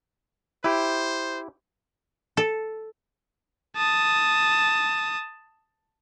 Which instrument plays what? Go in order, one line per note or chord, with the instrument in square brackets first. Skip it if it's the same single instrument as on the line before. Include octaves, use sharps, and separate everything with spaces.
[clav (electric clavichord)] E4 G4 [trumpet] C5
[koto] A4
[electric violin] A5 D#6